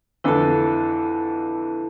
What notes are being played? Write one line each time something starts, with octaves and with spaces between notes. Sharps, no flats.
F2 D3 E3 E4 A4 A5